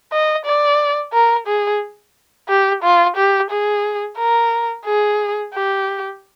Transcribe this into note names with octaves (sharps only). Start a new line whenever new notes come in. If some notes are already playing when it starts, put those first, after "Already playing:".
D#5
D5
A#4
G#4
G4
F4
G4
G#4
A#4
G#4
G4